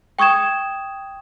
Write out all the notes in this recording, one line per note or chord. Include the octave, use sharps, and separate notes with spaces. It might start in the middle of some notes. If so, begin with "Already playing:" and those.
G5 C#6 D#6 G#6 E7